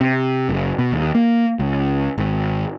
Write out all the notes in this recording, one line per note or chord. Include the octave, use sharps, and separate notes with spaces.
C3
F#1
B2
D#2
A#3
C#2
G#1